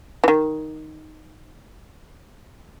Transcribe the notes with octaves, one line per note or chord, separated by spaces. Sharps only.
D#3 E3